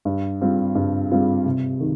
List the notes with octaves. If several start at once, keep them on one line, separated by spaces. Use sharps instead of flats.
G2
G3 C4 F4
G2
G3 C4 F4
C3
D#3